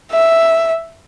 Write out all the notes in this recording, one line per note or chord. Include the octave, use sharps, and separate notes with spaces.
E5